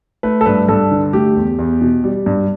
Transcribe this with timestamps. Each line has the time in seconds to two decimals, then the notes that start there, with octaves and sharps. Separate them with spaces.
0.23 A3 B4
0.41 A4
0.46 G2 B4
0.68 G2 A4
0.91 D3
1.13 A3 G4
1.36 E2
1.59 E2
1.81 B2
2.04 G3
2.26 G2